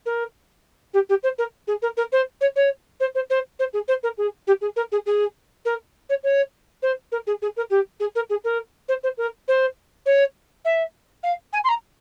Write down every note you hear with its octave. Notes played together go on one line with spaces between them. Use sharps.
A#4
G4
G4
C5
A#4
G#4
A#4
A#4
C5
C#5
C#5
C5
C5
C5
C5
G#4
C5
A#4
G#4
G4
G#4
A#4
G#4
G#4
A#4
C#5
C#5
C5
A#4
G#4
G#4
A#4
G4
G#4
A#4
G#4
A#4
C5
C5
A#4
C5
C#5
E5
F5
G#5
C6
A#5